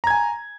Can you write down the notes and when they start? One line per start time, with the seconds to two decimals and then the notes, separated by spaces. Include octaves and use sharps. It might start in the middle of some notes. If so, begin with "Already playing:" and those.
0.04 A#5
0.07 G#6
0.10 G#5